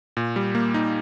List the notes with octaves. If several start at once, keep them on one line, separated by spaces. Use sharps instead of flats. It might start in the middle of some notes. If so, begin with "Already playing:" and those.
A#2
G3
A#3
D#4